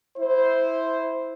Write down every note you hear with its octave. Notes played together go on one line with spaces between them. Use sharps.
E4 C5